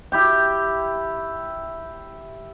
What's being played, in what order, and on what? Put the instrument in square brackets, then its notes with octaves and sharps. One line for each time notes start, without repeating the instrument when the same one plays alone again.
[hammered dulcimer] E4 G4 G5